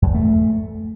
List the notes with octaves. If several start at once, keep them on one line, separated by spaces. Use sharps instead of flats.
F#2
E2
A3